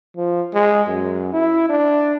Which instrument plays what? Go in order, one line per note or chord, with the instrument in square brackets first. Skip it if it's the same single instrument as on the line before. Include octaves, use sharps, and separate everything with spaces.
[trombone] F3
G#3
F#2
E4
D4